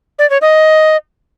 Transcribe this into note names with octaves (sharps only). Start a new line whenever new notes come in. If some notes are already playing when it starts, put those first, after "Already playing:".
D5
C#5
D#5